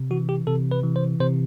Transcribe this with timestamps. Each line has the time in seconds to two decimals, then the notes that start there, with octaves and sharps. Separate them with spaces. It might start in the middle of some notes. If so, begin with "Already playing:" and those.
Already playing: C3
0.11 E3 F#4
0.29 G4
0.47 C3 A4
0.71 B4
0.84 E3
0.96 C5
1.20 C3 C5